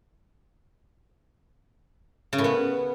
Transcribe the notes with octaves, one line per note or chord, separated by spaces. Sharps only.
C#3
A2
B3